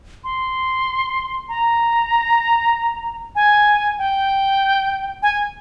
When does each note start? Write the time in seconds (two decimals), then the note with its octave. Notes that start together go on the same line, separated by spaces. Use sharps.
0.24 C6
1.49 A#5
3.35 G#5
3.98 G5
5.23 G#5